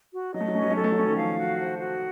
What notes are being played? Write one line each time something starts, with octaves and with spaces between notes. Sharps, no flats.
F#4
F#3 D#5
A3
F#3
A3 C#4
F#3
A3
F#3 A4
A3
F#3
A3 C#4
D#3 F#3
F3 F5
F#4
C5
F#4